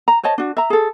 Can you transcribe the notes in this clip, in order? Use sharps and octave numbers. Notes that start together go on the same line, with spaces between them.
A#5
C5 C#5 D#5 A5
D4 F#4
E5 A#5
G#4 A4